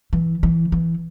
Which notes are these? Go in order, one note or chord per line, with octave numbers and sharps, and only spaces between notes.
E3
E3
E3